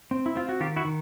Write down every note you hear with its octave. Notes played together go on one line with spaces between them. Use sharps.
C4
E4
C4 F4
F#4
D#3 F4 G4
E4 F#4
D#3